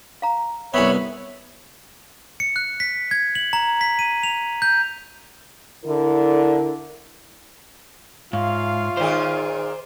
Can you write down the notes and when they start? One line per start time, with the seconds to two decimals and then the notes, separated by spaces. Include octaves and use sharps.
0.22 F5 A#5
0.74 C2 B3 C#5 E5 B5
2.40 C#7
2.56 F#6
2.80 B6
3.11 G#6
3.35 F#7
3.53 A#5
3.81 B6
3.99 D#7
4.23 F7
4.62 G6
5.85 D3 E4 A#4
8.33 G#2 F4 C#5 E5 F5
8.97 A#2 D#3 G#4 C5